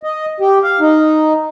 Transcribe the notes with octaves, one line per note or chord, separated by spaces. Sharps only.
D#5
G4
F5
D#4